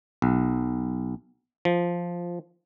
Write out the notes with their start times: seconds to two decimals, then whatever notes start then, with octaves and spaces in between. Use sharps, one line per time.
0.22 B1
1.65 F3